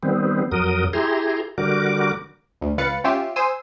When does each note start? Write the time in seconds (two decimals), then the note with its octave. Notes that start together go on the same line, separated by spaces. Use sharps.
0.03 D#3 G3 B3 C4
0.52 F2 F#3 A#4 D#6
0.93 E4 G4 G#4 A#5 C6
1.58 D3 G3 F#4 A#4 D6
2.61 D2
2.78 C#2 B4 F5 F#6 A6 C#7
3.04 C#4 F4 G4 E5 C6
3.36 C5 G#5 D#6 E6